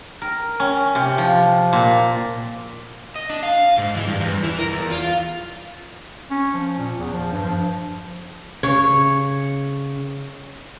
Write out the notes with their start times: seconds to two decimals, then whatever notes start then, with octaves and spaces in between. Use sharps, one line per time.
0.22 A#4
0.60 C#4
0.95 C3
1.18 F3
1.73 A#2
3.16 D#5
3.30 D4
3.43 F5
3.78 G#2
3.95 E3
4.07 G2
4.20 E2
4.42 E3
4.58 A#4
4.71 E2
4.91 F4
6.31 C#4
6.54 F3
6.77 A#2
6.98 E2
7.13 F3
7.32 G2
7.45 F3
8.63 C#3 C#5